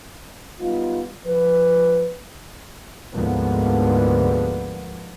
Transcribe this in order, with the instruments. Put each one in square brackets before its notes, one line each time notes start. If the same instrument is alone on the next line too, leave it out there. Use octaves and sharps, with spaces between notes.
[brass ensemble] G3 B3 D#4 F4
F3 B4
[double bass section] D2 G#2 F3 A#3 B3